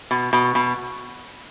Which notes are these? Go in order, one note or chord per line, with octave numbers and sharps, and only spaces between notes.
B2
B2
B2